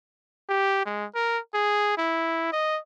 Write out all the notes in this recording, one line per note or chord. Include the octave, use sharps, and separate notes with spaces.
G4
G#3
A#4
G#4
E4
D#5